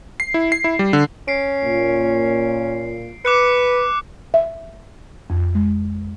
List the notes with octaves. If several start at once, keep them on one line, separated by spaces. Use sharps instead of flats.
C7
E4
C7
E4
G3
D3
C#4 C7 D7
A#2 A#3 F4
B4 D6 F#6 C#7
E5
F2
G#3